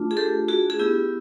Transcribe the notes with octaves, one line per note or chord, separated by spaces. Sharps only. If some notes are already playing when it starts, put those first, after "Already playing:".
Already playing: A3 D4 F4
G#4
G4 A4
F#4 G#4
G#4
B3 E4 G4